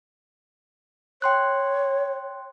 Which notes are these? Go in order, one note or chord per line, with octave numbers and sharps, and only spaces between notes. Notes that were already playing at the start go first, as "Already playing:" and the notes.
C#5 G5 C6 F#6